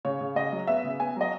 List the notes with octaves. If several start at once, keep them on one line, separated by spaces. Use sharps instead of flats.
C#3 C#5
C#3
C#3 D#5
F#3
B3 E5
C#3
B3 G#5
F#3 D#5